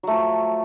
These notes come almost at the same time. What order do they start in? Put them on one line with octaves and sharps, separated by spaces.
F#3 A3 F3